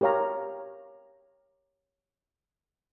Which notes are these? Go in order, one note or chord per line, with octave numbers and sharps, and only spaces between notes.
G4 A#4 C#5 F5 A#5